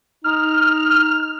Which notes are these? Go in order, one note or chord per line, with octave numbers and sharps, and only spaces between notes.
D#4 F6